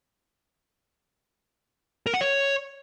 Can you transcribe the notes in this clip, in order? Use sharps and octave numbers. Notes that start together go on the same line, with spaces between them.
A#4
F#5
C#5